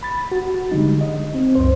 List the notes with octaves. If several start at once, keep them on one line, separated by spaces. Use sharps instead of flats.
B5 A6
F#4
D3 G3 G#3 D#4
D#5
C4
C#2 F#2 C5